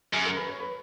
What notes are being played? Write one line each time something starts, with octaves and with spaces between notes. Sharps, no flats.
F#2 G#4 G#5
A#4 A#5
B4 B5
C#5 C#6
B4 B5